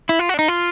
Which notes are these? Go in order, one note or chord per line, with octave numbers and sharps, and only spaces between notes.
E4
F4
F#4
D4
D#4
F4